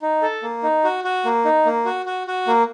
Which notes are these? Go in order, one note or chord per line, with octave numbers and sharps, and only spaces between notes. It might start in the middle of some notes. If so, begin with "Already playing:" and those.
D#4
A4
A#3
D#4
F#4
F#4
A#3
D#4
A#3
F#4
F#4
F#4
A#3